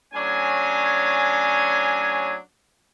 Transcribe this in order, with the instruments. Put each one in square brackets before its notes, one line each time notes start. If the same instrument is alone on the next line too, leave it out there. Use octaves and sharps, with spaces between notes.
[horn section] A2 F#3 C#4 D4 G#5